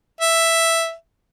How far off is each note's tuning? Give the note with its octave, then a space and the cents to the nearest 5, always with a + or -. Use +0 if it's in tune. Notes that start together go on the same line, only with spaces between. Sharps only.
E5 +0